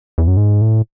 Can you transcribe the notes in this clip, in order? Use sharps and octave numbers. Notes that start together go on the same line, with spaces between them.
E2
F#2
G#2
A2